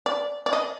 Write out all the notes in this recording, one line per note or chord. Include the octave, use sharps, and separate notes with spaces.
D5
D5
D#5